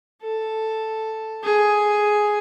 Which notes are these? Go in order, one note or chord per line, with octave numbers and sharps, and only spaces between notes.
A4
G#4